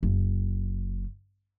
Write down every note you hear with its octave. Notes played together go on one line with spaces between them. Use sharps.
F#1